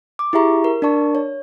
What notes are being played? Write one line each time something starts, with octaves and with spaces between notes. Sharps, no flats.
D6
E4 G4 G#4 E5 A#5 C#6
A#4
D4 A#4 D5 A5 C#6
C#5